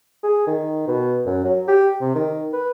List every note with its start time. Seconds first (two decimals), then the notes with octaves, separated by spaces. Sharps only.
0.24 G#4
0.47 D#3
0.88 B2
1.26 F#2
1.45 F#3
1.68 G4
2.01 C3
2.15 D#3
2.53 B4